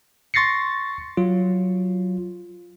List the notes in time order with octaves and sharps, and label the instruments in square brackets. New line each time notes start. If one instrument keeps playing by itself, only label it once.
[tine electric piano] C6 C#6 A6 A#6 C7 C#7
F#3 F4